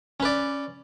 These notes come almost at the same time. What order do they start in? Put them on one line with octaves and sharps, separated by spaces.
C#4 B4 D5